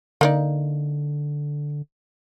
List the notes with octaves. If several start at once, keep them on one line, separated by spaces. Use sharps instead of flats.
D3 A#3 D#4 D5